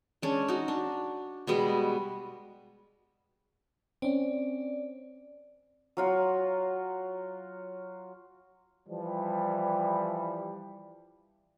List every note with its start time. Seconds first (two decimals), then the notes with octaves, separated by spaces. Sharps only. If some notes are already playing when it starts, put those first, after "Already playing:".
0.22 G#3 C#4 D4
0.48 D#4 F#4
0.68 D4
1.47 B2 G3 G#3 B3
4.02 C4 C#4 D5
5.97 F#3 F4 F#4
8.89 E3 F3 G3